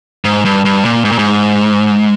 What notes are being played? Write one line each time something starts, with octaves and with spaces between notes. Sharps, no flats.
G#2
G2
G2
A#2
G#2
A#2
G#2